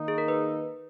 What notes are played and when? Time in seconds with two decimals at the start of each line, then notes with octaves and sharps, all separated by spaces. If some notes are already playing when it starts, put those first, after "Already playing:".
Already playing: D#3 A#3 D#4
0.08 G#4
0.18 A#4
0.28 B4